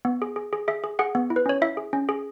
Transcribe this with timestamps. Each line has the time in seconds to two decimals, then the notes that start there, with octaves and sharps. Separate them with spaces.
0.05 B3
0.22 G#4
0.36 G#4
0.53 G#4
0.68 G#4 E5
0.84 G#4
0.99 G#4 F#5
1.15 B3
1.30 E4
1.36 B4
1.46 C#4 C#5
1.62 E4 E5
1.77 G#4
1.93 C#4
2.09 G#4